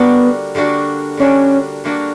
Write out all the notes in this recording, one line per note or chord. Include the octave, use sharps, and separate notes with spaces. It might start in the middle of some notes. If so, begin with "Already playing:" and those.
Already playing: D3 G3 A#3 B3 D4 F#4
D3 G3 A#3 D4 F#4
D3 G3 A#3 C#4 D4 F#4
D3 G3 A#3 D4 F#4